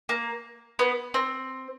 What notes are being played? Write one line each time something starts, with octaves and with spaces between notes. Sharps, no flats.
A#3
B3
C4